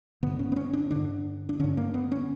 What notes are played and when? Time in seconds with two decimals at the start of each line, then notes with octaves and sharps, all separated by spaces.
0.23 G2 D3 B3
0.39 C#4
0.52 B3
0.56 C#4
0.73 D4
0.91 G2 D3 D4
1.49 D4
1.60 G2 D3 C#4
1.77 A#3
1.94 B3
2.12 C#4